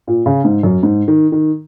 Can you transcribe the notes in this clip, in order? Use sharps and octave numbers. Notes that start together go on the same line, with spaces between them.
A#2
C#3
G#2
F#2
G#2
D#3
D#3